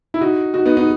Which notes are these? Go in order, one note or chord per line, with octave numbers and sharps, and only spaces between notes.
E4
D#4 F#4
D#4 F#4
B3 D#4
B3 D#4